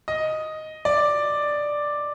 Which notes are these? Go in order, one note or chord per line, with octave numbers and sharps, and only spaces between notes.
D#5
D5